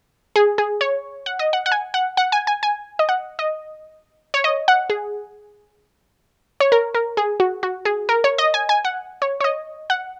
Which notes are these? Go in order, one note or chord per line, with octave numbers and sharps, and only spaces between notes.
G#4
G#4
C#5
F#5
D#5
F#5
F#5
G#5
F#5
F#5
G#5
G#5
G#5
D#5
F#5
D#5
C#5
D#5
F#5
G#4
C#5
A#4
A#4
G#4
F#4
F#4
G#4
A#4
C#5
D#5
G#5
G#5
F#5
C#5
C#5
D#5
F#5